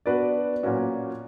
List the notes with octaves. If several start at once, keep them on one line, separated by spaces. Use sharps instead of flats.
B3 D4 F#4 B4 D5
A#2 F#3 A#3 C#4 F#4